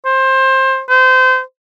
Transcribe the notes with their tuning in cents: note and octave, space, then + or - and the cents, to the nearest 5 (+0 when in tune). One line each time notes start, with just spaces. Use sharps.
C5 +20
C5 -30